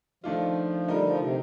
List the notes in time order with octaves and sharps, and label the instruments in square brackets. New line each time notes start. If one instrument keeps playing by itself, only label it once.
[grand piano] D#3 A3 D4 F4 [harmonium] F3
[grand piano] D3 A3 D#4 A#4 [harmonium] G3
[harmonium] F3
C3